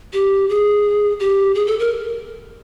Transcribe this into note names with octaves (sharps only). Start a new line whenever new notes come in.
G4
G#4
G4
G#4
A4
A#4